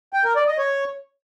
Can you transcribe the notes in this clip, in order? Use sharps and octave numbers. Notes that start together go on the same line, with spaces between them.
G5
A#4
D5
D#5
C#5